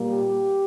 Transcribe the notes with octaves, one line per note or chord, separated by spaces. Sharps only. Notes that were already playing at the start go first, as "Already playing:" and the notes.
Already playing: A#2 G3 A#3
G4